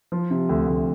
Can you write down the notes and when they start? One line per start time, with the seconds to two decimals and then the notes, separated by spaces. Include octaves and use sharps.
0.12 F3
0.30 C3
0.49 D2
0.67 D2